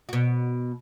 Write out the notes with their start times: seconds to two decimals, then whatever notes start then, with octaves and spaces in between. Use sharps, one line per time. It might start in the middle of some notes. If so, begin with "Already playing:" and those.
0.09 B2 F#4